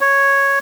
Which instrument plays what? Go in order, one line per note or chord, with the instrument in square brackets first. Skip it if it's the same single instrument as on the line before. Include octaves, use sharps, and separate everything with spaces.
[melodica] C#5